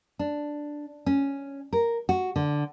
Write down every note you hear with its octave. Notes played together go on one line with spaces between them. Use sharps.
D4
C#4
A#4
F#4
D3